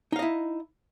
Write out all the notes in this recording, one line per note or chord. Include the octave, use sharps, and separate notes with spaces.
D#4 E4 D#5 F5